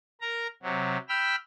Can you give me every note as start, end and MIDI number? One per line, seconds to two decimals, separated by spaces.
0.21 0.47 70
0.21 0.47 82
0.63 0.97 48
0.63 0.97 54
1.09 1.36 79
1.09 1.36 83
1.09 1.36 88
1.09 1.36 89